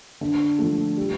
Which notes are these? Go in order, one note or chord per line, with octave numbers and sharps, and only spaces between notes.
D3
F3 A3
G3